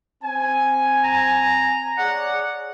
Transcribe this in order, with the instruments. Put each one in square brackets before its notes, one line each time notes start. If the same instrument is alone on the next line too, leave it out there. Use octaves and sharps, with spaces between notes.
[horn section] C4 G#5
[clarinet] A#5
[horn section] G#4 C#5 D5 [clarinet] F#5